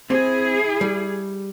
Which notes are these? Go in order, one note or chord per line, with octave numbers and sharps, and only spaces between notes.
C4 E4 G#4
G3